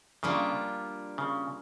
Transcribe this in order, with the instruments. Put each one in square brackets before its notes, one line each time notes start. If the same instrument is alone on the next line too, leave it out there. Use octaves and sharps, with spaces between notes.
[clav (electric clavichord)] C#3 [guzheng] G3 A#3 D4 F4
[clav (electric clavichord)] C#3